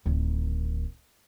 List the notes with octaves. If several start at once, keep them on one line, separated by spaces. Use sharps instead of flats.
D1 D#3